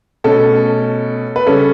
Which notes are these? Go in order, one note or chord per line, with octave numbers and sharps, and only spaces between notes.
B2 A3 C#4 A4
B4
C#3 G3 C#4 A4